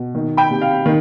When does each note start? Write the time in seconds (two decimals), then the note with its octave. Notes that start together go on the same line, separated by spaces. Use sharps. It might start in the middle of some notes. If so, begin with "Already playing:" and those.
Already playing: B2
0.15 D#3
0.37 G5 B5
0.51 C3
0.62 F5
0.86 D#3